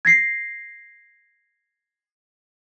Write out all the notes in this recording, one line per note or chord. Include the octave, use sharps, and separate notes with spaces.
G#6 A#6 C7